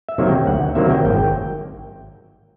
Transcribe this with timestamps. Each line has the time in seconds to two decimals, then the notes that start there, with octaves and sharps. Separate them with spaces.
0.09 E5
0.18 C3 D#3 F#3 A#3
0.28 G5
0.47 D2 F#5
0.75 C3 D#3 F#3 A#3 E5
0.91 G5
1.05 G#1 G5